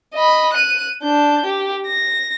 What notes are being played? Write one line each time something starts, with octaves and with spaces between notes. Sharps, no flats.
D#5 B5
F#6 D#7
D4 G6
G4
A#6